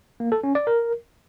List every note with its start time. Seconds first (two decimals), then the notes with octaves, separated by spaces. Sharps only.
0.20 A#3
0.32 A4
0.44 C#4
0.55 D5
0.67 A#4